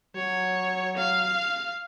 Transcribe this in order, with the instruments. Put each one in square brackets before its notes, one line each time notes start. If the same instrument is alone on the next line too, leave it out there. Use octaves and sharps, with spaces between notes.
[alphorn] F#3 [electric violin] C#5
[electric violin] F5